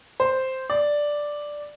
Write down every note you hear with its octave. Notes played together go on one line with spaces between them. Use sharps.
C5
D5